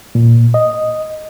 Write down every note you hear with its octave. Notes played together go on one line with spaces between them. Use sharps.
A#2
D#5